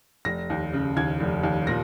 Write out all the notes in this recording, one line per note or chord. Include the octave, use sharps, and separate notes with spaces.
F1 A#6
D#2
C#3
D#2 G#6
F1
D#2
A#2 A#6